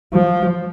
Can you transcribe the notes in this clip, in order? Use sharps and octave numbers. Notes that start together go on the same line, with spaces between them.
F3